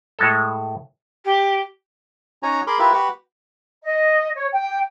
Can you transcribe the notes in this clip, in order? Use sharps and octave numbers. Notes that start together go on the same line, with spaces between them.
A2 G#3 A4
G4
C#4 D#4 F#4 C#5 G#5 A#5
G#4 A#4 B5 C6 D6
E4 F4 G4 A#4 B4 E5
F#4 G4 B4 F#5
D#5
C#5
G5